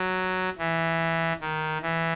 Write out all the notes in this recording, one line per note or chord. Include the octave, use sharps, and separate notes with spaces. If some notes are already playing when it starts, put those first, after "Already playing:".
Already playing: F#3
E3
D#3
E3